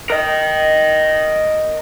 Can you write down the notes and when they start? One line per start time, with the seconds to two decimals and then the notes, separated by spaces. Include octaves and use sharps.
0.10 A#4 D#5